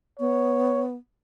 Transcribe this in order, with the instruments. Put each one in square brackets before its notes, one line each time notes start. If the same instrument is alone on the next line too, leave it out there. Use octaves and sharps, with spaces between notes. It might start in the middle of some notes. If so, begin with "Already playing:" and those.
[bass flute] B3 [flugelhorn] C#5